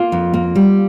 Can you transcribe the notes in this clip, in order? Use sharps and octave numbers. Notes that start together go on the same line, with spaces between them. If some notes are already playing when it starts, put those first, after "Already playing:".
Already playing: A#3 F4
F2
A#3
G3